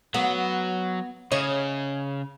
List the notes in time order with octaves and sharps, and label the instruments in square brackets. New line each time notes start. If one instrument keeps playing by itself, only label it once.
[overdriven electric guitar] F#3 [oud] B3
[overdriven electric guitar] C#3 [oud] C#5 D#5